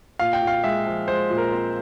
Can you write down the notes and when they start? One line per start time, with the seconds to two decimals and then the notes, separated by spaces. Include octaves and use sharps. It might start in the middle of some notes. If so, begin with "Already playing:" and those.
0.19 A#2 F5
0.33 G5
0.42 A#2
0.47 F5
0.64 G#3 E5
0.86 F3
1.08 G#3 C5
1.30 A#2
1.38 A#4
1.52 C4